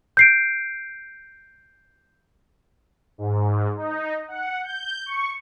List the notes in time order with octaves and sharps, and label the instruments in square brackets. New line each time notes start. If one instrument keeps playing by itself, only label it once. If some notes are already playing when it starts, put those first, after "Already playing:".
[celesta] G6 C7 D7
[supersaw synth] G#2
D#4
F#5
G6
C#6